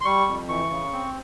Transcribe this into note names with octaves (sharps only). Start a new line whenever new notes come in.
C6
G3 C#6
F2
E3 C#6
C#3
C4